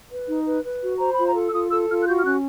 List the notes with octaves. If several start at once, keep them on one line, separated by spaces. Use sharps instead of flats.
B4
D#4
B4
B4
F#4
C5 A#5
F4 B5
A#5
A4
E6
F4 D#6
A4 E6
F4 F6
F#6
F#4 G6
F6
C#4 F#6